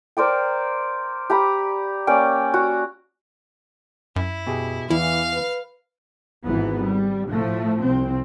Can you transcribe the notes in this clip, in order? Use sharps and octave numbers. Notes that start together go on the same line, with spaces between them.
A#4 C5 D5 G5
G4 A#5 B5
A#3 C#4 D5 G5
F#4
F#2 E4
B2 G4 G#4
E2 E3 E4 F5
B4
G#1 E3 B3
G3
A2 F3 A3
C2 C4